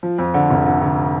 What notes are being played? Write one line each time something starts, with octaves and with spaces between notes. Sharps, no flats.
F3
F2
D3
F1
D3
D3